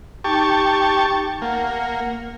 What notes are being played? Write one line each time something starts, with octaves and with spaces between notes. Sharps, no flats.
D#4 G4 A5 C#6
A#3 F#5